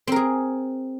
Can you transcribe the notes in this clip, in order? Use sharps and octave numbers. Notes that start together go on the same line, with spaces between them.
C4 G#4 A#4